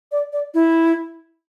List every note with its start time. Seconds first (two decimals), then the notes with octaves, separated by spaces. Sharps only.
0.12 D5
0.33 D5
0.54 E4